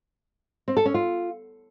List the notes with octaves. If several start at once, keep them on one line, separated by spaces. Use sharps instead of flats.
C4
A4
C#4
F4